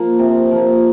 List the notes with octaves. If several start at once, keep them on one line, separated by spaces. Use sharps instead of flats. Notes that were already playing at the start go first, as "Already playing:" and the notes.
Already playing: F3 A#3
C3
F3 A#3